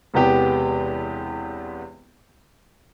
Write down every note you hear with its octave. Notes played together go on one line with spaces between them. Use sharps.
E1 E2 C3 B3 G4 G5